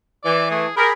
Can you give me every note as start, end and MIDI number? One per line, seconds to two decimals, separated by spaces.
0.24 0.66 52
0.24 0.49 74
0.51 0.67 57
0.51 0.73 68
0.77 0.91 67
0.77 0.93 68
0.77 0.88 70
0.77 0.93 83